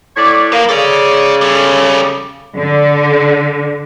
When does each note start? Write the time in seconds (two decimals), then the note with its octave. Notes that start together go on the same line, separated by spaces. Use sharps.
0.16 A2 C#5 D5
0.52 A#3 B4 F5
0.69 C#3 A4 D5
1.41 G3 A4
2.57 D3